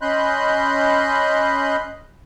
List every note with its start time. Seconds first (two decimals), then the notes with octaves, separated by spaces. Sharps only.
0.02 C#4 D#5 B5 C6 F#6 G6